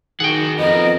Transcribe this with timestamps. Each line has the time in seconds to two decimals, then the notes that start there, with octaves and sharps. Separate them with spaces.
0.20 D#3 F#4 G#4 F#5 G5
0.59 F2 B3 A#4 D#5